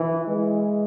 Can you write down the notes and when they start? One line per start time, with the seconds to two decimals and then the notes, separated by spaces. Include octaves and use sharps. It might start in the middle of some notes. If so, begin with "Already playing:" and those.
Already playing: E3
0.27 G#3